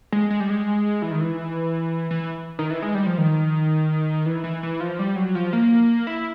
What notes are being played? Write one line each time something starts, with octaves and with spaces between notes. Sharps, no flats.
G#3
G#3
G3
G#3
E3
D#3
E3
E3
D#3
E3
G#3
G3
F3
D#3
E3
E3
E3
F3
G3
F#3
F3
A#3
E4